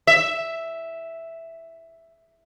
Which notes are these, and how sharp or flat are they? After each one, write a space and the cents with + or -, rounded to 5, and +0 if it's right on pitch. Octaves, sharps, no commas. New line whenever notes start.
E5 +0